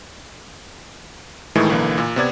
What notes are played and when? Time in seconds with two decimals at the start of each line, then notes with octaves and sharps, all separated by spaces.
1.55 A2 D#3 E3 G#3 A3
1.70 B1 D3 E3 A#3
1.98 A#2
2.16 C3 B3 D5 G#6